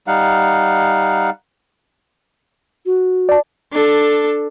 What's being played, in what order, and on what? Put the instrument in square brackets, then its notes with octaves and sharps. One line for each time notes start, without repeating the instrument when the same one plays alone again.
[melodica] G3 D#4 F5 F#5
[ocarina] F#4
[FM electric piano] D5 A5
[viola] D4 A4